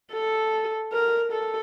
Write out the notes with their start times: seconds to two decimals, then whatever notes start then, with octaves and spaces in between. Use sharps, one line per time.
0.12 A4
0.93 A#4
1.32 A4